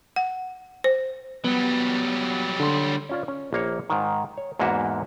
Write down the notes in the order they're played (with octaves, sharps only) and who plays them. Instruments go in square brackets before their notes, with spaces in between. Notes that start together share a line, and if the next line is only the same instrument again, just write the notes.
[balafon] F#5
C5
[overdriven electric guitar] F#3 G3 [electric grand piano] B3
[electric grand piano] D3 C6
[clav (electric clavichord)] C#4 F4 D5
C#4
A#1 A#3 C#5
G#2 D#3
C#5
E2 G#2 A#3 F#4 E5